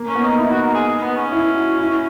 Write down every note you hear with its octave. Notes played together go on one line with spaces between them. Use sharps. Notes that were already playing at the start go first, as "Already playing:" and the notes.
Already playing: A#3
C#4
B3
D#4
D#4 E4
F#4
A#4
G#4
B3
C#4
E4
F#4
E4